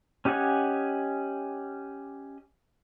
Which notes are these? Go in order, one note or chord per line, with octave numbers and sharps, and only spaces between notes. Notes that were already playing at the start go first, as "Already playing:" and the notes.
C#4 G4 D#5 F#5 G#5